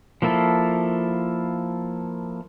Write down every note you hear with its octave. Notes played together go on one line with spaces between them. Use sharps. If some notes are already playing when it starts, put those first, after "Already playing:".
F3 A#3 E4 A4